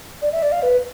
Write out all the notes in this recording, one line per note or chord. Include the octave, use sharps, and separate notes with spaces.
D5
E5
D5
F5
B4